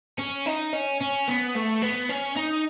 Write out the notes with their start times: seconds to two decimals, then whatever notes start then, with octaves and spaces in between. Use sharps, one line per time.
0.19 C#4
0.46 D#4
0.73 C#4
1.01 C#4
1.28 B3
1.55 A3
1.82 B3
2.09 C#4
2.36 D#4